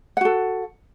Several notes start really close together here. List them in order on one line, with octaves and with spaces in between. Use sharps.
F#5 F#4 A4